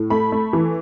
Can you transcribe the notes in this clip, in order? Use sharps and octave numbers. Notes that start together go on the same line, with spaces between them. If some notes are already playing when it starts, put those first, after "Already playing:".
Already playing: A2
A3 B5
A3
E3